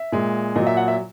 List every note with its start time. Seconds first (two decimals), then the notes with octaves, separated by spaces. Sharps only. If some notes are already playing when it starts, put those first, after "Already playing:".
Already playing: E5
0.12 A#2 G#3
0.56 A#2 F#3 D#5
0.67 E5
0.77 F#5
0.88 E5